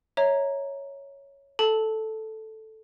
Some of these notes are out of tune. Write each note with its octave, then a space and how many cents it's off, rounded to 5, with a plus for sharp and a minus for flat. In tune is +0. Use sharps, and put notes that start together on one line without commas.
C#5 +0 E5 -25 A#5 +0
A4 +0 A5 +0